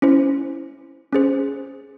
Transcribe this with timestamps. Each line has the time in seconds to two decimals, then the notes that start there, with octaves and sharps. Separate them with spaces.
0.02 C#4 E4 C5
1.13 C#4 G#4 C5